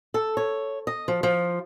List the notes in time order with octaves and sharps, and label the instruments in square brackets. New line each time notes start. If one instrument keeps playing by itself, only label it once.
[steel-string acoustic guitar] A4
C#5
D#5
F3
F3